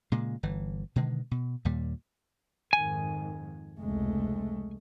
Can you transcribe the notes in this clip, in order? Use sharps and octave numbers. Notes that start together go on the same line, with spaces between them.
A#2 C#3 G#3
G1 E3
B2 D3 D#3 G#3
B2
D#2 A#2 G3
F2 G#2 D#3 G#5
F1 C#2 G#3 A3